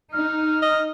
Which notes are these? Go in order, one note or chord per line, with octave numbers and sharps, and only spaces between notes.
D#4 F6
D#5